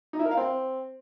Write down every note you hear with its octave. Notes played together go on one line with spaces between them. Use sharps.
D#4
E4
A#4
F5
C4